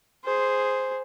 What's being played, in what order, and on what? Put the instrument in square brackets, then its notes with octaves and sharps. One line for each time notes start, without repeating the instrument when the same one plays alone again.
[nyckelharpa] G#4 C5